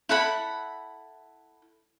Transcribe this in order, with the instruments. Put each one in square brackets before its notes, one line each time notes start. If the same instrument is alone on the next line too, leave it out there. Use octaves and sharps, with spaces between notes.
[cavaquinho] E4 A4 F#5 B5